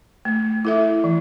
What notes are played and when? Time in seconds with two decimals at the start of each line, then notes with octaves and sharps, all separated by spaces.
0.25 A3
0.65 E4 A4 E5
1.04 E3